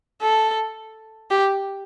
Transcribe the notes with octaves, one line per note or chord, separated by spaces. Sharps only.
A4
G4